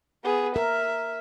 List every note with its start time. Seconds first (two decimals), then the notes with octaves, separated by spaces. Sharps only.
0.25 B3 G#4
0.56 A#4 E5